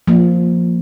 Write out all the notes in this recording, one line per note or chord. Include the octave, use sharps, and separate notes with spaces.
F3 A#3